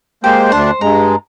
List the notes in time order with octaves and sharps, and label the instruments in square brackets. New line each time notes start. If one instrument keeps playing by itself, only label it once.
[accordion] G#3 A#3 C5 [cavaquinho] G4
[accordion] D2 D4 [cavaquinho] C5
[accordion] G2 G#3 [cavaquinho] A#5